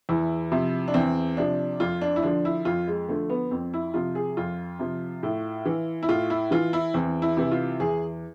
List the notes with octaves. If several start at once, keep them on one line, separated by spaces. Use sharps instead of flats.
E2 E4
C3 F3
D4
E2 C4
C3 F3 D4
F2 F4
D4
E4
D3 F3 D4
E4
F2 F4
G#3
D3 F3 A3
B3
F2 C4
E4
C3 F3 F4
G#4
F2 F4
C3 F3
A2
E3
E4
A2 F4
E4
E3 F4
E4
E2 C4
E4
C3 E3
F4
E2 G#4